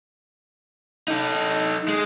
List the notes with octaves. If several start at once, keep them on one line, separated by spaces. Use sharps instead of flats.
D#4 A4
G#3